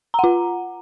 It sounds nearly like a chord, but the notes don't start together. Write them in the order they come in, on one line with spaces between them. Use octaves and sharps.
A#5 F#5 F4